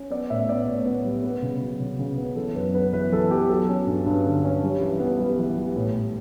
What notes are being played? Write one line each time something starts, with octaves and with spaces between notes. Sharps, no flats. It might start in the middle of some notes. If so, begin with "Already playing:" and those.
Already playing: C#4
B3 D5
A2 E5
B3 D5
A2 C#5
B3
G3
B3 B4
C#3
F#3
C#3
C#3
B3
E3 A4
F#2 B4
B3 B4
E3 B4
E3 A4
B3 G4
F#3 A4
C#4
G2
G2
D3
C#4
G3
E3
B3
G3 B4
E3
G3
A2
A2